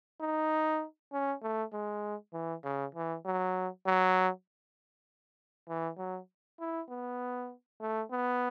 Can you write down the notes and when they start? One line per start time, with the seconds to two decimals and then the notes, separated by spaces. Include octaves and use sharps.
0.21 D#4
1.13 C#4
1.42 A3
1.73 G#3
2.33 E3
2.64 C#3
2.95 E3
3.25 F#3
3.86 F#3
5.68 E3
5.98 F#3
6.60 E4
6.89 B3
7.81 A3
8.11 B3